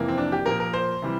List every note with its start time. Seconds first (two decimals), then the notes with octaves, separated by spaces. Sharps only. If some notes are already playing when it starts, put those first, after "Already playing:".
Already playing: F2 C3 E3 A#3
0.08 C4
0.18 D4
0.32 G4
0.46 A#2 F3 A#3 A#4
0.60 A#4
0.73 C5
1.02 C3 E3 G3